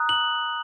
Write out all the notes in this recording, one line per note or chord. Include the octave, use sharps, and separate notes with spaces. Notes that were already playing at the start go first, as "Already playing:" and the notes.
Already playing: A#5 D#6 F#6
F#7